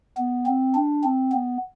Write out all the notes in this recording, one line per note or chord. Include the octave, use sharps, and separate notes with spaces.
B3
C4
D4
C4
B3